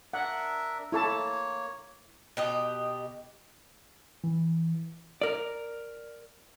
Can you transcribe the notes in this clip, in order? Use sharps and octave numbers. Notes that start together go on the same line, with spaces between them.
D4 A#4 E5 F#5
A#3 E4 A4 C#5 A5
B2 G4 D#5
E3
A#4 D5